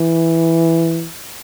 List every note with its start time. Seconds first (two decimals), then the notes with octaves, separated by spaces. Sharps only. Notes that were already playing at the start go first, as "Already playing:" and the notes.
Already playing: E3